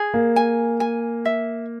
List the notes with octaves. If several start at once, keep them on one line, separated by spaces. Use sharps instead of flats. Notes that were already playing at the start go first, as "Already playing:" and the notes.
Already playing: G#4
A#3
G#5
G#5
E5